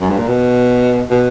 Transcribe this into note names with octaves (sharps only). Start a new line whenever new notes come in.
F#2
G2
A#2
B2
B2